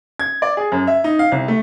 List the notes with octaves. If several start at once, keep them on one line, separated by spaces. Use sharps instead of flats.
G#6
D5
G#4
F#2
E5
D#4
F5
C2
A3